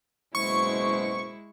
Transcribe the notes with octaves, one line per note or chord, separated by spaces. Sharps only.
F#1 B2 G#3 E4 C5 C#6